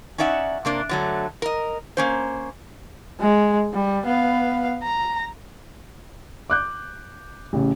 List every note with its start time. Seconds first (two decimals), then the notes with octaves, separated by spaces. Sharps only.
0.18 C#4 D#4 D5 E5 F#5
0.65 C3 A#3 D4
0.89 D3 F#3 A3
1.42 A#4 D#5
1.97 A#3 C#4 C5
3.20 G#3
3.73 G3
4.07 B3 F5
4.83 A#5
6.50 D6 F#6 G6
7.53 A1 C#3